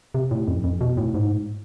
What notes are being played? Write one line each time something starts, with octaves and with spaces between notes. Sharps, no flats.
C3
A2
F2
F2
B2
A2
G#2